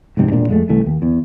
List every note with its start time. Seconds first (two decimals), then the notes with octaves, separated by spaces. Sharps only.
0.17 F1 C#2 G#2 C3
0.32 E1 A#2 D4
0.49 F2 G#3 A3
0.69 C2 E3 A3
0.86 D#2
1.02 E2